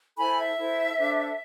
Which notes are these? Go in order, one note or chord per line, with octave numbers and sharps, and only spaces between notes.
E4 A4 C5 G#5 B5
E5
E4 A4 C5
D4 A4 C5